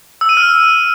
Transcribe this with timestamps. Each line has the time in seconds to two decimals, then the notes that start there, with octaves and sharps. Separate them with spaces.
0.21 E6
0.29 D#7
0.37 F6